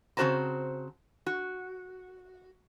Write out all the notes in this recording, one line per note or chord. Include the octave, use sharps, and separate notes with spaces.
C#3 C4 F#4 C5 A5 A#5
F#4